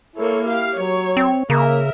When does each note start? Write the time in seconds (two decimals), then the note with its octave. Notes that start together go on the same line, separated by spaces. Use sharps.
0.16 A#3 E4 A4 C#5
0.46 G4 F5
0.78 F#3 C#5
1.17 C4
1.50 C#3 A#3 A#4 E5